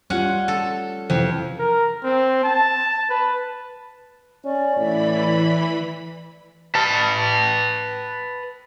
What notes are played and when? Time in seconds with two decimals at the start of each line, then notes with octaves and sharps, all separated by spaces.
0.10 G3 C#4 F4 F#5
0.48 A4
1.10 F2 C3 E3 C5
1.59 A#4
2.04 C4
2.44 A5
3.10 B4
4.45 C#4 D5
4.77 A2 E3 B5
6.75 B4 A5